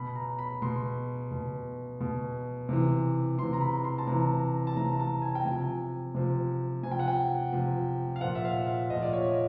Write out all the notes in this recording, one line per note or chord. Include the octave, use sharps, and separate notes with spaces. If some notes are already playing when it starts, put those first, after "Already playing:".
Already playing: B2 B5
A#5
B5
B2 C6
B2
B2
C3 E3
C3 E3 C6
A#5
B5
C6
A5
C3 E3 A#5
A5
C3 E3 A#5
A#5
A5
G#5
G5
C3 F3 G#5
C3 F3
C3 F3 G#5
G5
F#5
G5
C3 F3
F5
A#2 F3 F#5
E5
F5
E5
A#2 F3 D#5
D5
C#5
D#5